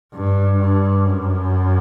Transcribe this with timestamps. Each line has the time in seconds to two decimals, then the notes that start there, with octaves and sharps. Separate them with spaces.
0.14 G2
0.60 G2
1.06 F#2